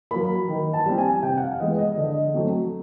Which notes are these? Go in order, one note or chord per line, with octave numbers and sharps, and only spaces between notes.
F#3 A#3 B5
D#3
A5
G3 C4
G#5
C3 G5
F#5
F5
E3 G#3 B3 D#5
D#5
D3 D#5
F#3 A3 C4